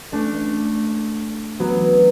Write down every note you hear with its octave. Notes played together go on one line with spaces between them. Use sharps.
A3 D4
F#3 B3